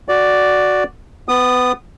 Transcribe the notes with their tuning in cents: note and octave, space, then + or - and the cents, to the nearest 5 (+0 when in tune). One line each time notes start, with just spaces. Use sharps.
F#4 +0 D5 +0
B3 +25 D#6 -20